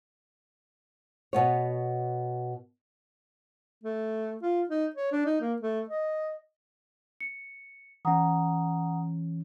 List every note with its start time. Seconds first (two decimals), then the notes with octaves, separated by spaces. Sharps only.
1.33 B2 B3 C#5
3.84 A3
4.42 F4
4.69 D#4
4.95 C#5
5.12 D4
5.26 D#4
5.41 A#3
5.62 A3
5.89 D#5
7.21 C#7
8.05 E3 C#4 F#5 A#5 D#6